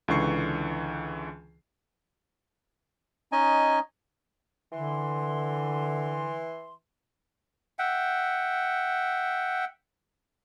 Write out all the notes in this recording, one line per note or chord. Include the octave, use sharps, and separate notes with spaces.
C#2 D3 E3 C#6 C7
C#4 D#4 D#5 G#5
D3 E3 C6
E5 F#5 G5